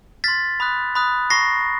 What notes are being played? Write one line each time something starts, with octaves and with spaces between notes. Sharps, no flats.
C6 F6 A6 B6
B5 D#6 F#6
B5 D#6 F#6
A#5 C#6 F#6 A#6 C7